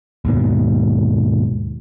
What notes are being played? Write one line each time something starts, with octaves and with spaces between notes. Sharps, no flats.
D#2 G#2 B2